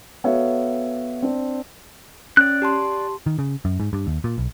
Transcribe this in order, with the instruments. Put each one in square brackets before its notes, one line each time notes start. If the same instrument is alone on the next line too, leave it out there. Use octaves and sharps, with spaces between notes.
[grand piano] B3 F#4 A4 C#5 E5 F5
C4 D4
[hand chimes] C#4 [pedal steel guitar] D5 F#6
[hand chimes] G4 A5 C6
[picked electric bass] D#3
C#3
F#2
G#2
G2
D#2
A#2
B1